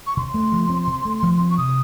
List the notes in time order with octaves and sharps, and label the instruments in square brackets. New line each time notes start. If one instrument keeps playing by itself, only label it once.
[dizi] C#6
[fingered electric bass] C#3 [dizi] C6
[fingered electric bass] A3
F3
C4
C#3
A3
F3
C4
[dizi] C#6
[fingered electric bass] C3 [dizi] D#6